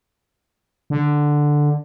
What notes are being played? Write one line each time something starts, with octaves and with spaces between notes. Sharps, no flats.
D3